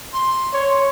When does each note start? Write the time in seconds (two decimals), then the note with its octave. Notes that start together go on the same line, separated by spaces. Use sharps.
0.13 C6
0.53 C#5